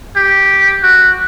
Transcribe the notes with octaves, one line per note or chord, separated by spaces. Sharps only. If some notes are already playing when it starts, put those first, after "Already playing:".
G4
F#4